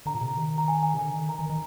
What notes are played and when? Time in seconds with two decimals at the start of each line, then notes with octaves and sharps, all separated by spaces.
0.06 D3 A#5
0.14 A#2
0.21 C3
0.37 D#3
0.58 A#5
0.68 G#5
0.83 G#5
0.94 C3
0.98 D3 G#5
1.14 D#3
1.29 A#5
1.39 D#3
1.49 D#3